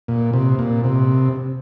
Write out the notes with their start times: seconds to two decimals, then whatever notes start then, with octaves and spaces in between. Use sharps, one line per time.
0.08 A#2
0.33 C3
0.59 A#2
0.84 C3